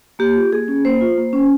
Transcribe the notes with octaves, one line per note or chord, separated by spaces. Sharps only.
A#3 G4
F4
A#3 G#4
C#4
A#3 C5
F4
A#3
C#4